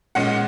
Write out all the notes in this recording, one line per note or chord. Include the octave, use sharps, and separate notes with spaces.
A#2 G#3 C#4 F#5